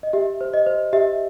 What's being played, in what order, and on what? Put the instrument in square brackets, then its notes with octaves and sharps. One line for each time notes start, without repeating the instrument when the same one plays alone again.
[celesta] D#5
G4 E5
C5
D#5
C5
G4 E5